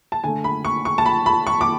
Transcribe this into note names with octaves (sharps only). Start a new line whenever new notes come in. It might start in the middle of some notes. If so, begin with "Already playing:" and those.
A5
D3 A3 G#5
B5
C#6
C#6
A5
B5
B5
C#6
D6